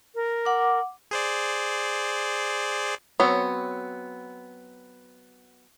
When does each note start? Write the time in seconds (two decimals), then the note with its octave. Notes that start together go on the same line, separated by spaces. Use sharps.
0.15 A#4
0.45 F#5 D6
1.11 G#4 C5 D5
3.20 F#3 B3 C4 C#5